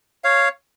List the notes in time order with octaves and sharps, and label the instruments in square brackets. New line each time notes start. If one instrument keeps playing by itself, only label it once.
[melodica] C#5 F5